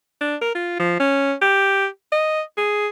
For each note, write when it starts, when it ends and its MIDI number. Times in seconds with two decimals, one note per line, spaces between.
0.21 0.36 62
0.41 0.53 70
0.55 0.75 65
0.79 0.96 53
1.00 1.34 61
1.42 1.87 67
2.12 2.41 75
2.57 2.88 68